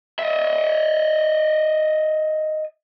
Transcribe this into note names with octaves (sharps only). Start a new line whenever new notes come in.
D#5 E5